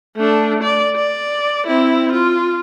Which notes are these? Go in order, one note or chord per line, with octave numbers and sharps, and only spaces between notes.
A3 D4
D5
D5
C4 E4
F4